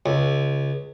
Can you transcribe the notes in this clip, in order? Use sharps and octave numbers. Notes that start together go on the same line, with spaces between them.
C#2